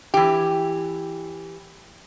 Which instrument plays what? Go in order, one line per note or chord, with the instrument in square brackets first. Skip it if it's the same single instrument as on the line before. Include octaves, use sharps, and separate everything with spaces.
[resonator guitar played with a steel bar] E3 G4